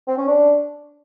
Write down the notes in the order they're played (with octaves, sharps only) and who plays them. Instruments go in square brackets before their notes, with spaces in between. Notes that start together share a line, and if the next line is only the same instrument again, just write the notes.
[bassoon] C4
C#4
D4